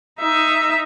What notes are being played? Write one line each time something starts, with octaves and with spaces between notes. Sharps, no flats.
D#4 E5